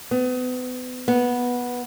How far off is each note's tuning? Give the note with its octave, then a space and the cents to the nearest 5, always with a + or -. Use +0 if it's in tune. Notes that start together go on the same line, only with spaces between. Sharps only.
B3 +35
B3 -10